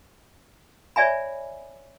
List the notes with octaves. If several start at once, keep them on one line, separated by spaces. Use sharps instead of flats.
C#5 D5 E5 G#5 B5